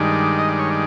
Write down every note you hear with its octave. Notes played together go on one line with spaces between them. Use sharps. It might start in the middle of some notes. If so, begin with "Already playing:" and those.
Already playing: G2 D#3 G#3 D5
D#5
D5
C#5
D5